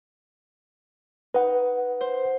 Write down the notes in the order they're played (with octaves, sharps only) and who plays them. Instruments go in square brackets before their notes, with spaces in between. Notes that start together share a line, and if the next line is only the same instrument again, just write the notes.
[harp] D#4 [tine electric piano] B4 F#5
[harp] C5